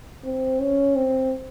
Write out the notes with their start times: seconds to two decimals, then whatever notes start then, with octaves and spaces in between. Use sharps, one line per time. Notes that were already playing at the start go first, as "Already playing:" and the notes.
0.24 C4
0.60 C#4
0.96 C4